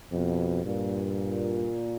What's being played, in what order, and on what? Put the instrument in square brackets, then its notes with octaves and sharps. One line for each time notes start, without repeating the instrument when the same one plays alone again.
[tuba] F2 [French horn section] B2
[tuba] G2 [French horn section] A#2